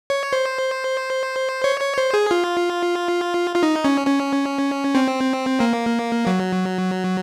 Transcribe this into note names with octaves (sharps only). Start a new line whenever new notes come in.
C#5
C5
C#5
C#5
C5
G#4
F4
F4
D#4
C#4
C#4
C4
A#3
F#3